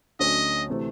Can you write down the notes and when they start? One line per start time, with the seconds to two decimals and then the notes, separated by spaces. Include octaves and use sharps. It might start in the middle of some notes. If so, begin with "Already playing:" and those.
0.19 D2 D3 F#3 A3 C#4 D#5
0.69 C3 E3 A3 C4